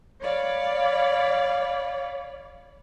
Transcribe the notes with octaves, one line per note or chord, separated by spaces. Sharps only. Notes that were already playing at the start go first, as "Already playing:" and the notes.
C#5 D5 F5 B5